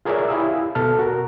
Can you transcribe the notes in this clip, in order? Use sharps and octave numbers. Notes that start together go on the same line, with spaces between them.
F4 G#4 A#4 C#5 D5 E5
E4 G4 F5 G#5 D#6 E6
B2 A4 A5 F6
F#4 A#4